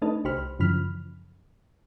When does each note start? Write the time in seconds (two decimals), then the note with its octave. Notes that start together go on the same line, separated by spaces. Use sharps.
0.02 A3 D4 D#4 A4 B4 D#5
0.25 C2 G4 C5 B5 F6
0.59 F#2 C#3 E3 F3 B5 F6